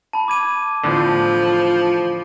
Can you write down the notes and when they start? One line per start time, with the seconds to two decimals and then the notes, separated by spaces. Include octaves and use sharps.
0.13 A5 B5
0.28 D6 G#6 D#7
0.84 E2 A2 D3 F3